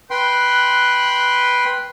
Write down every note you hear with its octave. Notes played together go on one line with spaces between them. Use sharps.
B4 G5 C6 F#6